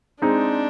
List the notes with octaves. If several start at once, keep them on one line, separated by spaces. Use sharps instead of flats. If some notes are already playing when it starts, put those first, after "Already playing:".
G#3 C4 D4 D#4